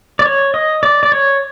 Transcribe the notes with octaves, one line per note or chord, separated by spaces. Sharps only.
D5
C#5
D#5
D5
D5
C#5